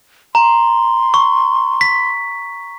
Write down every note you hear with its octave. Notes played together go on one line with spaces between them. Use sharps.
A#5 C6
C#6
B6